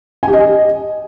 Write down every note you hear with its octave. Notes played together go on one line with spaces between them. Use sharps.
G#5
G4
D#5